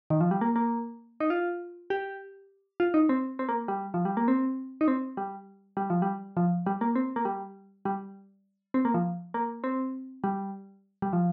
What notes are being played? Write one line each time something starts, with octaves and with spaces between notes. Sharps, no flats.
D#3
F3
G3
A#3
A#3
D#4
F4
G4
F4
D#4
C4
C4
A#3
G3
F3
G3
A#3
C4
D#4
C4
G3
G3
F3
G3
F3
G3
A#3
C4
A#3
G3
G3
C4
A#3
F3
A#3
C4
G3
G3
F3